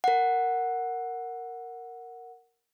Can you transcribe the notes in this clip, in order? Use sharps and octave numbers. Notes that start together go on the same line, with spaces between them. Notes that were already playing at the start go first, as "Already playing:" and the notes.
A#4 F#5